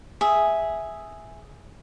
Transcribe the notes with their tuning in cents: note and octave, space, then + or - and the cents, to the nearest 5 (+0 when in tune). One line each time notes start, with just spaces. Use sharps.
G#4 +0 E5 -5